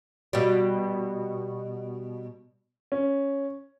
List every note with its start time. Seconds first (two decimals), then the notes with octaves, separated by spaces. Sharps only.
0.33 B2 G3
2.92 C#4